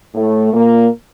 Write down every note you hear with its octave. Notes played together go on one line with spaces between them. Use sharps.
A2 A3
A#2 A#3